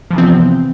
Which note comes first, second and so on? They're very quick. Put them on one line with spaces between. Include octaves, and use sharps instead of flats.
F3 E3 C3 C4 B3